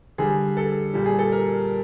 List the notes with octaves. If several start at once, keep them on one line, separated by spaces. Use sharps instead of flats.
D3 G3 G#4
A4
A#2 G3
G#4
A4
A#4